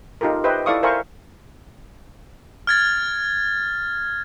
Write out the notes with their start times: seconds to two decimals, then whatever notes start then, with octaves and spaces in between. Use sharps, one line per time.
0.21 D#4 F4 G4 A4 A#4
0.44 G4 B4 C5 D#5 E5 G5
0.66 E4 A4 D5 F5 C#6 D#6
0.83 A#4 C5 E5 F5 G#5 C#6
2.67 F6 G#6 A6